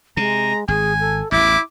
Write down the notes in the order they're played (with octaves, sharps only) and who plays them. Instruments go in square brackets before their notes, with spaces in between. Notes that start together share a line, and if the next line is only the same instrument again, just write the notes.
[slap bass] C3 [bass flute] G#3 [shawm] A#5
[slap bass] G#1 [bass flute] G#4 [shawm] G#5
[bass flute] A4
[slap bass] A1 E2 [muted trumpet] E4 [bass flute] E5 [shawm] D6